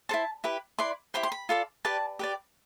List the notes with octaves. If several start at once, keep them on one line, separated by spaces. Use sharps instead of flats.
E4 A4 C5 A5
E4 G4 B4
E4 B4 D5 C6
E4 G4 C5 B5
C6
B5
F4 A4 D5
G4 B4 D5 A5
G4 B4 D5